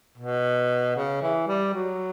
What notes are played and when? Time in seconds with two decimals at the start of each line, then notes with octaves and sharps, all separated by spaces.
0.18 B2
0.96 C#3
1.22 E3
1.47 G3
1.74 F#3